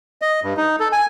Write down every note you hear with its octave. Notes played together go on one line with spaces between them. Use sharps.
D#5
G2
D#4
A4
G#5